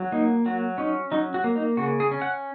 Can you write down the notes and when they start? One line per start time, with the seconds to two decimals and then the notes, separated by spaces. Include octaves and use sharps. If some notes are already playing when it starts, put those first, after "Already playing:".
Already playing: F#3
0.12 A#3 D#4
0.46 F#3 F#4
0.78 C#4 D#4
1.12 F#3 D#4
1.34 F#4
1.44 A#3
1.56 D#4
1.77 C#3 F#4
2.00 G#4
2.11 C#4
2.22 F#5